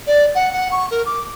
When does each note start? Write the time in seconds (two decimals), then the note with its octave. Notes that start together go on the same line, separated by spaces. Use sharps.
0.07 D5
0.35 F#5
0.52 F#5
0.72 C#6
0.91 A#4
1.06 D6